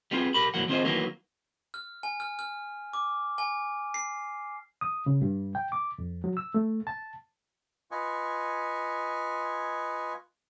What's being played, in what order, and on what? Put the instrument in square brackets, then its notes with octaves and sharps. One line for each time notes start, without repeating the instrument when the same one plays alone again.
[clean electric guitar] G3 B3 C4 F4 G#4
B1 G4 A#4 B5
B1 F2 E3 F#3 A#3 F#5
D#3 C4 F4 G#4 C5 D#5
D#3 E3 F#3 A#3 B3
[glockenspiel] F6
G#5
F6
F6
D6
G#5
C7
[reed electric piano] D#6
C#3
G2
G5
D6
F2
F#3
E6
A3
A5
[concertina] F4 B4 D#5 G#5 C#6